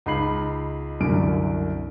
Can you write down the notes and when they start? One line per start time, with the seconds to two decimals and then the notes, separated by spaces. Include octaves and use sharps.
0.06 C#2 D#4 B5 C7 F#7
1.00 C2 F#2 D3 D7